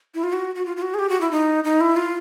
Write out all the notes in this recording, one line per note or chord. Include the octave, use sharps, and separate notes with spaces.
E4
F4
F#4
F#4
F4
F4
F#4
G#4
G4
F#4
E4
D#4
D#4
E4
F4